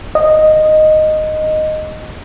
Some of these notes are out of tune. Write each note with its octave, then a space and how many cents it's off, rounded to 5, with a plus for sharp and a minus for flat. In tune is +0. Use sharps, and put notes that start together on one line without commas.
D#5 -5